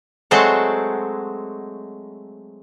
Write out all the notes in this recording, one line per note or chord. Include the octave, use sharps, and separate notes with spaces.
F#3 G#3 A3 C4 F#5